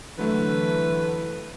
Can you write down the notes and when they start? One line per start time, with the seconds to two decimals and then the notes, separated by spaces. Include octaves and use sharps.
0.18 D3 E3 F#3 A3 B4